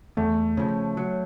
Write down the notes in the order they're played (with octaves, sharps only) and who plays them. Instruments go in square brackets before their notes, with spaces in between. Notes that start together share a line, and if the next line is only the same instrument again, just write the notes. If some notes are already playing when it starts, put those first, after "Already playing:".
[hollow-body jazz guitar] E2 [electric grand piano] A3
[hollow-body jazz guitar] C#3 F3
F#3